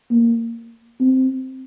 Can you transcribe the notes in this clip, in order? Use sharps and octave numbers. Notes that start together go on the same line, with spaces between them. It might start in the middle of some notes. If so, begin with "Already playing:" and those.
A#3
C4